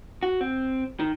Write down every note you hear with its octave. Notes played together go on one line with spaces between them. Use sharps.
F#4
C4
D#3